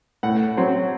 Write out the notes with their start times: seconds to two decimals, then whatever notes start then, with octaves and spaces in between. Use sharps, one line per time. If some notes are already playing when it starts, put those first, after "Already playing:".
0.23 A2 F#5
0.57 F#3 C4